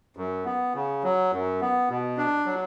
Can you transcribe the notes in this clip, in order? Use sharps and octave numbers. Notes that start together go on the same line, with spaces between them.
F#2
B3
C#3
F#3
F#2
B3
B2
D4
F#3